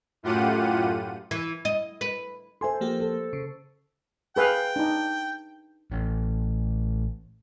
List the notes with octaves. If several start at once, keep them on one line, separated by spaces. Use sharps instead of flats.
F#2 A2 F4 G4 F#5 D#7
E3
D#5
B4
A4 C5 E5 G#5 C6
F3 A#3 G4
A4
C#3
G#4 B4 F5 G5
D4 D#4
A1